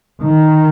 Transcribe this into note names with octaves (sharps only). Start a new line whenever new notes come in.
D#3